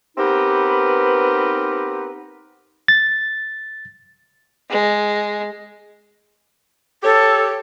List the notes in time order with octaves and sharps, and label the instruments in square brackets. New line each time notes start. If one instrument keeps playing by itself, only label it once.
[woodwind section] B3 C4 D#4 G4 A#4 B4
[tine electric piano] A6
[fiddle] G#3
[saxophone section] G4 C#5 [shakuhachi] A4